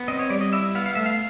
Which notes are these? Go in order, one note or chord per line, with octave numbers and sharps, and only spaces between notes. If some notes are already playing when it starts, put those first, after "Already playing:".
Already playing: B3
C4 D#5
C#5
G3 D5
D#5
E4 E5
B3 F5
F5
A3 E5
F5